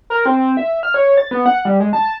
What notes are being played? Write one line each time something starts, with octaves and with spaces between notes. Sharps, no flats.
A#4
C4
E5
F6
C#5
A6
B3
F#5
G3
G#3
A5